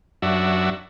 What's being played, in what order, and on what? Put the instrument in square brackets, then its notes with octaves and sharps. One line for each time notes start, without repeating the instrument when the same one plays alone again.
[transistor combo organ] F#2 D4 F#4 E5